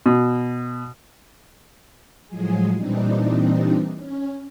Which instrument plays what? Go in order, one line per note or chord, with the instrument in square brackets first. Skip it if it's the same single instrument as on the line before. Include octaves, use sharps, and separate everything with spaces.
[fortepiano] B2
[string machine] A2 F3 F#3 G#3 G#4
A#2 E3 G3 C4 D4 D#4
C#4